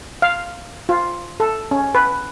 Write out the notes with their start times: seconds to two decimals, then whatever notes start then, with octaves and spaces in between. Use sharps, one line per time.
0.22 F5
0.89 F4
1.40 A4
1.71 C#4
1.95 B4